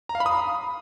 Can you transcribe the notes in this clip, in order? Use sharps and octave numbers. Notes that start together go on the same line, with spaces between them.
A#5
F5
B5
D#6